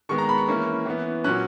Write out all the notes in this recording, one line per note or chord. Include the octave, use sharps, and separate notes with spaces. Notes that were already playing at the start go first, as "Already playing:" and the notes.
D#3 G#3 B3 C#6
A#5
B5
C#6
E3 A#3 C#4
E3 B3
A#2 F#3 C#4 F#6